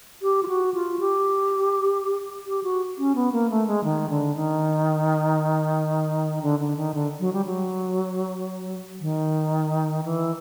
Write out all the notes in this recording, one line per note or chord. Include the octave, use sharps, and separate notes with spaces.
G4
F4
F#4
F4
G4
G4
F#4
C#4
B3
A#3
A3
G#3
D#3
D3
D#3
D3
D3
D#3
D3
F#3
G3
F#3
D#3
E3